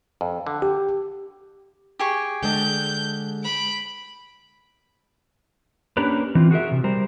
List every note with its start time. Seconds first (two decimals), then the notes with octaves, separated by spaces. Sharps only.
0.21 F2
0.47 D3
0.62 G4
1.99 G4 G#4 C#6
2.43 D3 G#3 A5 G6
3.43 B5 D7
5.97 A#3 C#4 D4 G4 A#4 B4
6.35 E3 C4 F4
6.51 F#4 G#4 A#4 E5
6.72 C3
6.84 G3 A#4 C5